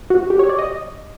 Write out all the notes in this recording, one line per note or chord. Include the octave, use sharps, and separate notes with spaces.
F#4
G4
C#5
D5
D#5